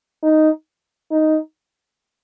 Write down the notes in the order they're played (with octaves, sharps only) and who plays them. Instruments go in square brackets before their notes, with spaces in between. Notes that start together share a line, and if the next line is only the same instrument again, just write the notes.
[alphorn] D#4
D#4